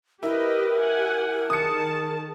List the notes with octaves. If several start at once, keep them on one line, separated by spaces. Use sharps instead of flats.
E4 G4 A#4 B4 D#5
G4 F#5 G#5
D#3 G#4 A5 D#6 C#7